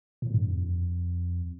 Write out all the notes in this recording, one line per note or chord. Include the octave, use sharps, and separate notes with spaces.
A2
G2
F2